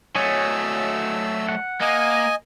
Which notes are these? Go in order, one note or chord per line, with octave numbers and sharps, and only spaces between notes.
F#3 A3 C#5 D#5 G#5 E6
F#5
A#3 D#5 G#5